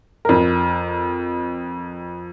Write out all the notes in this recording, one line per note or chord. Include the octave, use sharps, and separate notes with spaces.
F2 A#4